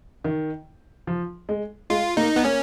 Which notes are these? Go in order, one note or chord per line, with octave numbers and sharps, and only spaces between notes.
D#3
F3
G#3
G#3 F4
A#3 D#4
B3
A#3 C#4